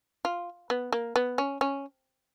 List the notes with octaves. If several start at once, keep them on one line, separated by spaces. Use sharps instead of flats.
F4
B3
A#3
B3
C#4
C#4